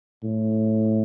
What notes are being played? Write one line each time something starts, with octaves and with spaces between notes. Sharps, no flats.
A2